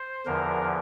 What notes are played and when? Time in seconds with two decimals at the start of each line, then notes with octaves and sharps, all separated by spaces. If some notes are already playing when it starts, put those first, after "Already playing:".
Already playing: C5
0.26 E2 D3 F3 A#4